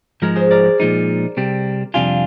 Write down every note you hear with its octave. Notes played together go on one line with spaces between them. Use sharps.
G#2 F3 G#3 A#4
G#4 C5
A#4 D5
A#2 F3 G#3 D#4
C3 G3 C4
F2 C3 G3 D4 F4 F5 G#5